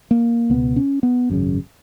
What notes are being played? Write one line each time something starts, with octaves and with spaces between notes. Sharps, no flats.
A#3
C#2 B2 B3
C#4
B3
G#1 F#2 C#3